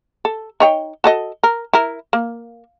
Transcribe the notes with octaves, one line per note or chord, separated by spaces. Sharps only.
A4
D#4 C#5 G5
F#4 A4 D#5
A#4
E4 A#4
A#3